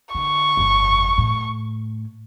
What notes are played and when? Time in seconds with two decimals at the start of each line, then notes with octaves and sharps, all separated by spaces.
0.15 D3 C#6
0.57 G1 F2
1.18 A2